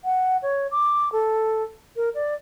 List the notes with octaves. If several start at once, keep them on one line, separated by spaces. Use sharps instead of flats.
F#5
C#5
D6
A4
A#4
D5